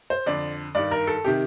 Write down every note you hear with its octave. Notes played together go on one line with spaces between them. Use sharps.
C5
F2 D3 D5
G2 D#3 D5
A#4
A4
C3 D#3 G4